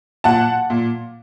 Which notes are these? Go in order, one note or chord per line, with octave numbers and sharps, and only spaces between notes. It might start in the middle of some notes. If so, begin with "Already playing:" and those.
A#2 F#5 A5
A#2